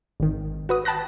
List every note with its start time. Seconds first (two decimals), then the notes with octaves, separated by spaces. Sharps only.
0.20 G#1 D#3
0.69 F#4 B4 D#6
0.85 G5 A5 B5 F#6 A#6